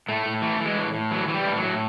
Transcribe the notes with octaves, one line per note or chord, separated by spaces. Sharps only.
A2 A3
A2
E3 A3
E3
G#3
A2
A2
E3 F#3
E3 F#3
G3
A2
F#3
A2